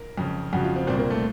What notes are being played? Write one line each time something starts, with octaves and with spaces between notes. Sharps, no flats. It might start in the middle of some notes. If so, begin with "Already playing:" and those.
Already playing: A#4
F2 C#3
F2 C#3 F#4
F4
C4
C2 A#2 C4
A#3
A3